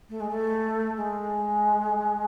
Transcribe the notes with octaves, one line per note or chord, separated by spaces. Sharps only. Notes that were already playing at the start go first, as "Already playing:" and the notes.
A3
G#3
A3
G#3